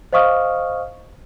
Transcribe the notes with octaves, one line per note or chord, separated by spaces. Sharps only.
C5 D#5 F5 C#6 D#6 F6